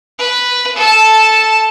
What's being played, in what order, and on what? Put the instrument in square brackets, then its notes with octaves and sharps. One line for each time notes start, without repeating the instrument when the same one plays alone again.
[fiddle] B4
A4 A5